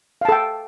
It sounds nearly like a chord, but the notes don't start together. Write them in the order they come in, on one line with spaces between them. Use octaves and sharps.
F5 A5 A4 G5